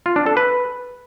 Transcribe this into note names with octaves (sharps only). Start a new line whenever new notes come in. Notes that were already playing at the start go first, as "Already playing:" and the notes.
F4
D4
A4
B4